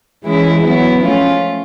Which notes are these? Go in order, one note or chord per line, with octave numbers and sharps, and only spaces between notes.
E3 G#3 C#4 E4
F#3 B3 E4
F3 A3 C#4 F4